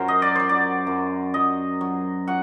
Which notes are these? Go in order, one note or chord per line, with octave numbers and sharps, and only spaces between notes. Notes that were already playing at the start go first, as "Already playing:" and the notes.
Already playing: F#2 F#3 A#4 C5
D#5
D5
F#3 C5
D5
F#2
F#3 D#5
F#3
F#3 F#5